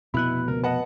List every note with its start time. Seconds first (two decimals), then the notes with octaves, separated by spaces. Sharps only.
0.14 F1 B2 B3 E4 B5 F#6
0.48 C#2 A#4
0.64 B4 D#5 F#5 A5